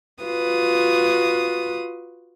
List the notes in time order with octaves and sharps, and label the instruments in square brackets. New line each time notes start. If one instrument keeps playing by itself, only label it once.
[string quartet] F4 F#4 B4 D#6